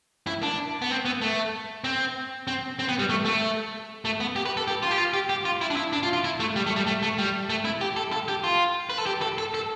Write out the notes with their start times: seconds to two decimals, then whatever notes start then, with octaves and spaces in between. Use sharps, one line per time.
0.27 E4
0.43 D4
0.82 B3
0.91 C4
1.05 B3
1.21 A3
1.84 C4
2.47 C4
2.79 C4
2.88 B3
2.99 G3
3.09 A3
3.25 A3
4.05 A3
4.20 B3
4.36 G4
4.45 B4
4.57 A4
4.68 G4
4.83 F4
4.91 G4
4.98 F4
5.13 G4
5.29 G4
5.45 F4
5.61 E4
5.70 D4
5.77 E4
5.93 D4
6.03 F4
6.13 F4
6.24 E4
6.40 A3
6.56 G3
6.66 A3
6.76 G3
6.87 A3
7.02 A3
7.18 G3
7.50 A3
7.65 E4
7.81 G4
7.96 A4
8.12 A4
8.28 G4
8.44 F4
8.90 B4
8.98 A4
9.06 G4
9.22 A4
9.38 A4
9.54 A4